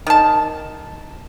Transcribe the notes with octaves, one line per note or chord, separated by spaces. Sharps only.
D#3 A5